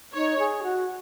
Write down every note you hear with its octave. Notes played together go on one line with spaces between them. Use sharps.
D#4 C#5
G#4
F#4